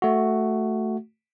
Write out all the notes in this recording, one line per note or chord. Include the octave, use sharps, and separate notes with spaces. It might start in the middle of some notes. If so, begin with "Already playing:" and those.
A3 F#4